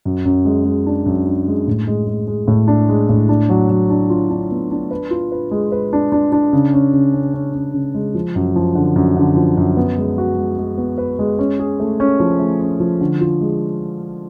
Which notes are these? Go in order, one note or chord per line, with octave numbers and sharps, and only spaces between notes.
F#2
F#2
G#3
G#3
D4
F#2
D4
G#3
A2
G#3
G#3
G#3
A2
D4
G#3
A2
D4
F#3
F#3
D4
F4
D4
B3
D4
B4
F4
B4
G#3
B4
D4
D4
D4
C#3
C#4
C#3
C#4
C#4
C#4
C#3
G#3
F3
F#2
F3
D3
F#2
D3
F3
F#2
B3
G#3
F#4
G#3
G#3
B3
B4
G#3
C#4
G#4
A3
C#4
F3
A3
C#4
F3
D3
F4
G#3